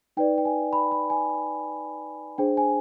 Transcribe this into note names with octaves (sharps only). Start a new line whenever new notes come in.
D#4 B4 D5 G5
G5
G#5
B5
B5
G#5
D4 G#4 C5 G5
G#5